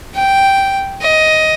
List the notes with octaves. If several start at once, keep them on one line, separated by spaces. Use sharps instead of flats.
G5
D#5